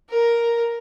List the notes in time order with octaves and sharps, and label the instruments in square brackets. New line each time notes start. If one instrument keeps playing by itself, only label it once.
[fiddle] A#4